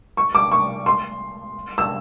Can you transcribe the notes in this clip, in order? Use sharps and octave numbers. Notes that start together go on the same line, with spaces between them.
C#6
D6
C#6
C6
E6